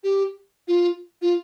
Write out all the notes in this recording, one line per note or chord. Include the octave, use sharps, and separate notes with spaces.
G4
F4
F4